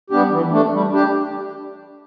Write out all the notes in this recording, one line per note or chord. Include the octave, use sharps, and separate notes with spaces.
G3 B3 D4 G4
E3
A3 D4
G3
D4 G4